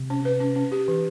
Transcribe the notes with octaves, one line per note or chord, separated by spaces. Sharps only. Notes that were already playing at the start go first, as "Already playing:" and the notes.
Already playing: C3
C#4
B4
C#4
C#4
G4
E3